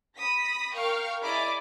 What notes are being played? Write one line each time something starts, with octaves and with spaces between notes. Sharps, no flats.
B5 D#6 A#6 B6
A#4 F5 G5 C#6 F6
E4 G#4 D5 D#5 A#5 D6